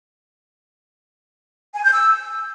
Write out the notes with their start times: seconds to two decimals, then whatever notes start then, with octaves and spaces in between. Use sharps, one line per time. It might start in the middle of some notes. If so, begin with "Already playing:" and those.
1.74 G#5
1.83 G6
1.93 E6